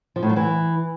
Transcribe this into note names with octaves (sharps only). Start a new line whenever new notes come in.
F3
A2
F#3
E3